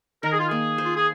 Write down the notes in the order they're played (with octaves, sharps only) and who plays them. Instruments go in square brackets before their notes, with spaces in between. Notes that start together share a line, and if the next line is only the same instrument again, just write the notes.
[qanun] D#3 [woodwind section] A#4
[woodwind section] G#4
F4
[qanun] A#3 [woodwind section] G#4
[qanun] C5
[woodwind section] F4
G#4